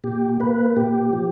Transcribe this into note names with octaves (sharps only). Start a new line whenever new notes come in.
A#2 G4
A#3 B4
A#2 G4
F3